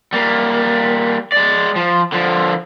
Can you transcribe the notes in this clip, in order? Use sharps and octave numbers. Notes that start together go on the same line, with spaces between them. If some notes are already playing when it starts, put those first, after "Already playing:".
G3 A#3
G#3 D5
F3
D3 F3